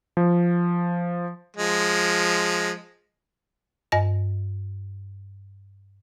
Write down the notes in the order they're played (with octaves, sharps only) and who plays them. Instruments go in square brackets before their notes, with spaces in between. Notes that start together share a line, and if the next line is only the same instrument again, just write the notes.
[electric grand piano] F3
[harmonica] F3 G#3
[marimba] G2 D#5 A#6